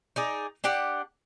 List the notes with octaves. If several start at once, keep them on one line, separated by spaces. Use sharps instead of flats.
D#4 G#4 D5
D4 G4 D5 F#5